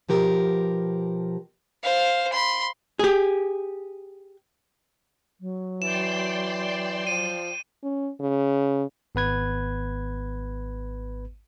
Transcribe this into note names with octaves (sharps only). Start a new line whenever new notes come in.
B2 F3 G4 A#4
C5 F5
B5 C6
G4 G#4
F#3
E3 D5 G5 C6 E7
F3 D#7
C#4
C#3
G#1 B3 B4 G#6